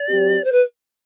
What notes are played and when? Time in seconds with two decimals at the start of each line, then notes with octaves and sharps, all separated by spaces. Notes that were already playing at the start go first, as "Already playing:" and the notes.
Already playing: D5
0.08 F#3 C4 G4
0.44 C5
0.52 B4